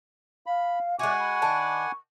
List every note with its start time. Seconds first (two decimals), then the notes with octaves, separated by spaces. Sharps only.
0.46 F5 B5
0.99 G#3 F#4 D5 E5 F#5 G#5 C#6 D6
1.18 B5
1.42 D#3 D4 A5